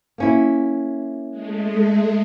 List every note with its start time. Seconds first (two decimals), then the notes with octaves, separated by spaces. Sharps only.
0.18 A#3 C#4 E4
1.31 G#3 A3